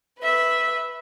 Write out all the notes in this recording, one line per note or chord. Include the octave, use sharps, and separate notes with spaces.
B4 E5